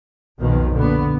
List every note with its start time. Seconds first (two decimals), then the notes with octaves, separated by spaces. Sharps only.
0.39 B1 F2 B2 D#3 F3
0.74 A#2 D3 B3